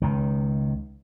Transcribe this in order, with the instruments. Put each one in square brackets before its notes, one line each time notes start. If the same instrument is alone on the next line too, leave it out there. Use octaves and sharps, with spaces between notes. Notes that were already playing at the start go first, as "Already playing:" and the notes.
[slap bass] C#2 D#3